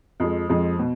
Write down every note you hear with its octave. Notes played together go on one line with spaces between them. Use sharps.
F2 F3 G#3
F2 F3 G#3
B2